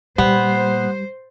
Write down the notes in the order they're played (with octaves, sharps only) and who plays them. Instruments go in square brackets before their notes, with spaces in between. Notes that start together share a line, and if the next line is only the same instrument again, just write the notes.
[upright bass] A#2 [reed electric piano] G3 [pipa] B3 [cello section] C5